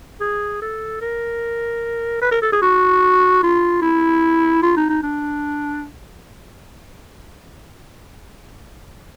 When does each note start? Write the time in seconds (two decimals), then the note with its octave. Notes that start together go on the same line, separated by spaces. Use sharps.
0.21 G#4
0.62 A4
1.02 A#4
2.22 B4
2.31 A#4
2.42 A4
2.52 G#4
2.62 F#4
3.43 F4
3.82 E4
4.63 F4
4.77 D#4
4.89 D#4
5.03 D4